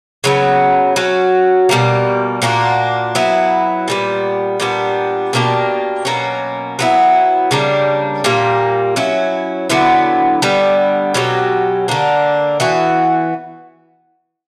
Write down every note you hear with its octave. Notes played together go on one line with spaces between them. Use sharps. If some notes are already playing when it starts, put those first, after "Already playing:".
C#3 F#3 B3
F#3 C#4 F#4
B2 G3 A#3
A#2 A#3 D4 F#4
F#3 B3 E4
A#2 G3 B3
A#2 G3 B3 D4
B2 A#3 D4 G4
B2 F#3 A#3 C#4
F#3 B3 E4
C#3 G3 A#3 D4
A#2 G3 A#3
F#3 C#4 E4
D3 F#3 B3 E4
D3 G3 B3
B2 F#3 C#4 G4
D3 A#3 D4
E3 B3 F#4